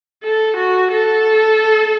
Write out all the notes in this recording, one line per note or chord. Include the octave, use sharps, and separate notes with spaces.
A4
F#4
A4